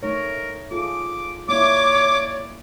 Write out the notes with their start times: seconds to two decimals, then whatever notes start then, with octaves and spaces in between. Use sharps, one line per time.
0.03 A3 D#4 A#4 C#5
0.71 F4 G#4 A4 D6
1.49 A#3 E4 C#5 D5 D6